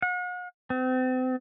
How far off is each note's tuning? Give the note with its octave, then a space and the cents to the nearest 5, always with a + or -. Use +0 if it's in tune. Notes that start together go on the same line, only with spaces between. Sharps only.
F#5 -40
C4 -35